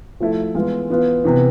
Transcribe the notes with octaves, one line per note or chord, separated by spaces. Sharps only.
F3 A3 E4 A4
E3 G#3 B3 F4
E3 B3 F4
C3 E3 B3